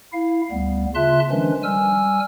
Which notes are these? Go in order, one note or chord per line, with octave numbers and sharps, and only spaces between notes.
E4 F5
D2 G3 B3
C#3 F4 E5 A5 C6 F#6
D#3 F3 G#3 C#4 D4 B4
G3 G#5 E6 F6